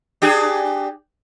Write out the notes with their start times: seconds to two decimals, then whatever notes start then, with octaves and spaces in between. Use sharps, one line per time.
0.22 D4 G4 G#4